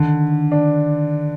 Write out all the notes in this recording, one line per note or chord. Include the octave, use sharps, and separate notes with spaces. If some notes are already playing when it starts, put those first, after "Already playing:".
Already playing: D3 D#3
D4